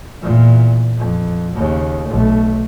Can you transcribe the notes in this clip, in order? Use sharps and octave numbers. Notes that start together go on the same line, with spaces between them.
E2 A#2
F2
D#2 C#3
B1 A3